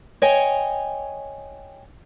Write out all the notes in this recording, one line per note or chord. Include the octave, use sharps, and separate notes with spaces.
C#5 D#5 G5 G#5